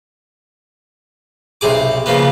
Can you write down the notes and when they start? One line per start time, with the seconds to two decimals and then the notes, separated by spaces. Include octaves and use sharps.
1.61 B1 C3 G#4 D6
2.06 C#3 F3 A#3 B3